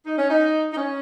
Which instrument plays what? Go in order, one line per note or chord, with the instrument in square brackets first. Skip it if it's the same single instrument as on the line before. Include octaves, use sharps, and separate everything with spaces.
[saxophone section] D#4
C#4
D#4
D#4
C#4